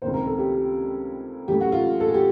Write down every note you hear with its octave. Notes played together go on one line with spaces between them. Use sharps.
C#2 C3 D#3 C5
A#4
A4
G4
F#2 C#3 E3 A3 G4
F#4
F4
A4
G#4
G4